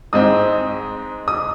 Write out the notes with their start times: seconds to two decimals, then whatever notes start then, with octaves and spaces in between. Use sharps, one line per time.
0.13 G#2 G#3 C4 D#4 D#6
1.28 D#6